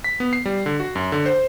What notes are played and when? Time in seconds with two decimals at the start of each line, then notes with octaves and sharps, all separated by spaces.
0.04 B6
0.20 B3
0.33 C7
0.45 G3
0.66 D3
0.80 F#4
0.95 F#2
1.12 D3
1.26 C5